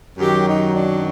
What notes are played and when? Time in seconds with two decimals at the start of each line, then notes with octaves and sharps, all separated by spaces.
0.18 F#2 D#3 F#3 G4
0.46 D#4
0.75 D4